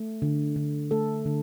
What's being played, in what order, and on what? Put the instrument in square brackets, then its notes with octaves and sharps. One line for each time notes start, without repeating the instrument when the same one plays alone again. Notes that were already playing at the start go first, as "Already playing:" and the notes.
Already playing: [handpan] A3
D3
D3
A3 A4
D3